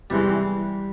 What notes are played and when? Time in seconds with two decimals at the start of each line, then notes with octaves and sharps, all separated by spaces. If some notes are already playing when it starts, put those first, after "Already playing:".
0.10 E2 C3 E3 G3 G#3